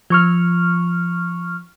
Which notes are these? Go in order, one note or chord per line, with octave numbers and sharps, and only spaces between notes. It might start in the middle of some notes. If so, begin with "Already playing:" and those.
F3 C#6 F6